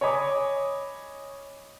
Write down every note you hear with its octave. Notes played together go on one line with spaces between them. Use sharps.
C#5 D#5 G#5 B5 D6 D#6